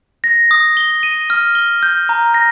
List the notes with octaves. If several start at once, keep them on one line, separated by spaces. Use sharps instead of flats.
A#6
D#6
G7
D#7
F6
G7
G6
A#5
A#6